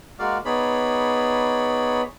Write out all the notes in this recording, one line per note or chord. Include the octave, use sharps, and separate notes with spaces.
G#3 A#3 F#4 D5 F5
B3 D#4 G#4 C#5 D5 B5